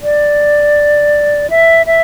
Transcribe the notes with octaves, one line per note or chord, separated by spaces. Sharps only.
D5
E5
E5